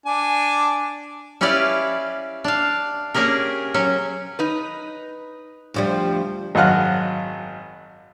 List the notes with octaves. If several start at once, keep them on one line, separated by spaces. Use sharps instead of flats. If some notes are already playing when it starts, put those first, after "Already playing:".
D4 G#5
C#4 E4 G4 B4 D5 F5
D4 F5
A#3 C#4 G4 G#4 A#4
F#3 C#4
D#4 B4
D2 F3 G3
G#1 F#2 F#3 F5 F#5 F6